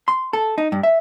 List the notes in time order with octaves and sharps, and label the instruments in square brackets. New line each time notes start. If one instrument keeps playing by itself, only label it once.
[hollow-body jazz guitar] C6
A4
D#4
G2
E5